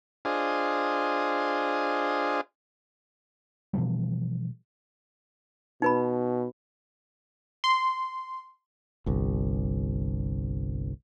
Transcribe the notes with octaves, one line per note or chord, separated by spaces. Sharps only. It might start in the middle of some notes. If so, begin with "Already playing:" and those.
D4 F4 G#4 C5 D#5
B2 E3 F3 G3
B2 D#4 B4 B5
C6
G1 C2